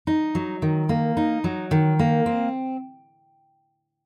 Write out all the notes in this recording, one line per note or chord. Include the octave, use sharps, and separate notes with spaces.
D#4
F#3
D#3
A#3
D#4
F#3
D#3
A#3
C4